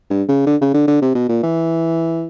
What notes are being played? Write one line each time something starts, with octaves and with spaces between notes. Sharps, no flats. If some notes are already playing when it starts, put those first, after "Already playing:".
G2
C#3
D3
C#3
D3
D3
C3
B2
A#2
E3